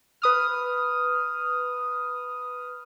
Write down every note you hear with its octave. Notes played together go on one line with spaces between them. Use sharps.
B4 D#6 F6